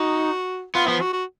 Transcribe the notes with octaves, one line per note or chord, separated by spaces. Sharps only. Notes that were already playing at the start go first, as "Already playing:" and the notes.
Already playing: D#4 F#4
B3 F4
F3 B3
F#4
F#4